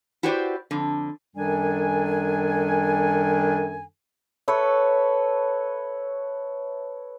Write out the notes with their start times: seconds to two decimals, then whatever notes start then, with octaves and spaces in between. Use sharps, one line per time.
0.23 E4 F#4 G4 B4 C5 D5
0.71 F2 D3
1.36 F#2 D#3 G3 D4 A4 G#5
4.48 A4 B4 C#5 E5